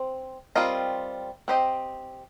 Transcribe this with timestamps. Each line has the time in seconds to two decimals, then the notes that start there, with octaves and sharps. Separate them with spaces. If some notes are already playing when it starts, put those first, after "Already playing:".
Already playing: C4 C5
0.55 G3 C4 F4 A#4 D#5
1.48 C4 G4 C5 D#5